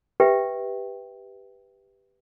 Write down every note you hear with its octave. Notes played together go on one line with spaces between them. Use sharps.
G4 B4 E5 G5